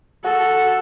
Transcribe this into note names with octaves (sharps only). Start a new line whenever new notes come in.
F#4 A4